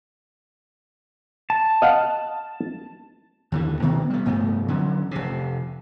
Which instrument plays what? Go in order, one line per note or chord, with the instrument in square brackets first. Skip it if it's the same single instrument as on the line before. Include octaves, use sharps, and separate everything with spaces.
[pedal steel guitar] A5
[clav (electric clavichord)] D#5 F5 F#5
[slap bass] D#2 D3 E3
B2 D#3 B3 C4
G3 B3
F1 G2 A3 B3
D3 E3 F#3 C#4
F1 C3